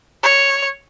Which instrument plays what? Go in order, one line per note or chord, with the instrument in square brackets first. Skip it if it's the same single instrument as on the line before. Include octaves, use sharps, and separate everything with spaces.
[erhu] C#5